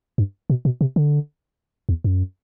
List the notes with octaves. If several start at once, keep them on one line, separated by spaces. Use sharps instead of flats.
G2
B2
B2
C3
D3
E2
F#2